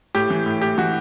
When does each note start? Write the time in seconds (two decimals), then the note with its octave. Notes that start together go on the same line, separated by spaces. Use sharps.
0.15 A2 G4
0.30 E3
0.46 A2
0.61 A2 G4
0.78 E3 F#4